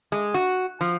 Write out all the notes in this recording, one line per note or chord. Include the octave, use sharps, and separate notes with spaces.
G#3
F#4
F3